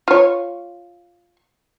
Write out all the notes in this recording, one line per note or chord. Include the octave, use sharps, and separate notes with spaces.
F4 C#5